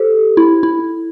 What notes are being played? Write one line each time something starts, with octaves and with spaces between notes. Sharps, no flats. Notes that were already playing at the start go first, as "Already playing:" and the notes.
Already playing: G4 A4 C5
E4
E4